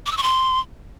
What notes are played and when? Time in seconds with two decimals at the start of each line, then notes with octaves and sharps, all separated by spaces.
0.06 D6
0.12 E6
0.17 C#6
0.23 C6